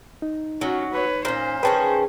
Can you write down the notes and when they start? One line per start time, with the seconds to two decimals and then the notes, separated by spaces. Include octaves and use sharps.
0.22 D#4
0.61 F#3 C#4 F#4
0.92 B4 C#5
1.25 A#2 C#4 C5
1.63 D#3 C#4 G#4 B4 G5 A5